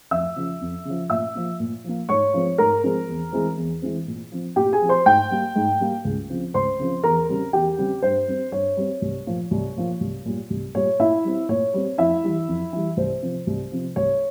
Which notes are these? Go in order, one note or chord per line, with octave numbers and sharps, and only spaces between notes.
F2 E5 E6
C#3 F3
F2
C#3 F3
A#2 E5 E6
F3 A#3
A#2
F3 A#3
G#2 C#5 C#6
F3 G#3 C4
G#2 A#4 A#5
F3 G#3 C4
E2
E3 G#3 C4
E2
E3 G#3 C4
A#2
F3 C4
A#2 G4 G5
G#4 G#5
F3 C4
C5 C6
G#2 G5 G6
G3 A#3
G#2
G3 A#3
C#2
C#3 F3 C4
C#2 C5 C6
C#3 F3 C4
E2 A#4 A#5
C#3 G3 C4
E2 G4 G5
C#3 G3 C4
G2 C5
G3 C4
G2 C#5
G3 C4
C2
A#2 F3 A#3
C2
A#2 F3 A#3
C2
A#2 G3
C2
A#2 G3 C#5
A#2 E4 E5
G3 C4
A#2 C#5
G3 C4
F2 E4 E5
E3 G3
F2
E3 G3
C2 C5
C3 F3
C2
C3 F3
C2 C#5